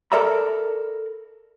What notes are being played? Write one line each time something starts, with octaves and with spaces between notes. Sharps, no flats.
A4 A#4 D5 E5 A#5 B5